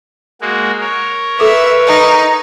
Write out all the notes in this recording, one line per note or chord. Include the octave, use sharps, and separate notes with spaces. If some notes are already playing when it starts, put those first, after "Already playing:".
G#3 A#3 F#4
A#4 C#5
A4 B4 E5 D6
D#4